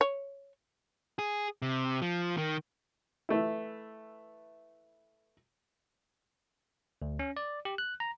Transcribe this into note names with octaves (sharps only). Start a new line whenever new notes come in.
C#5
G#4
C3
F3
D#3
E3 A3 E4
D2
C#4
D5
G4
F#6
A#5